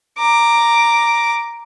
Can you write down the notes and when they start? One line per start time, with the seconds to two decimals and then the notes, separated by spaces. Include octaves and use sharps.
0.18 A#5 D6